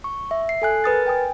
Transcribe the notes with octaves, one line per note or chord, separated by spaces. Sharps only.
C#6
E5
C7
A4 G#5 F#6
A#4 B4 D#6 A6
G5 G#5 D#6